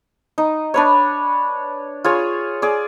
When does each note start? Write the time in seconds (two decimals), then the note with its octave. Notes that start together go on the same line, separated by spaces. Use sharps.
0.38 D#4
0.74 D4 B4 C#5
2.04 F4 G#4 C#5
2.62 G#4 D5